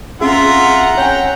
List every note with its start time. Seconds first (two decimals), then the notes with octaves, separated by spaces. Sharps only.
0.21 C4 C#4 F4 G#4 E5 F#5 A#5
0.97 C#5 G5 G#5